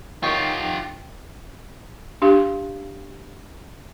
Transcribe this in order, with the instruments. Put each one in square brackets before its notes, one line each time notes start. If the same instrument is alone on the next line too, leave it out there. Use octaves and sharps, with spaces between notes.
[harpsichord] D#3 C#5 [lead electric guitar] F4 G4 [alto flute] G5
[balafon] D4 G4 F5